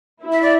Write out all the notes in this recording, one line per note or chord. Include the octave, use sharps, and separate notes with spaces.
E4
E5
D5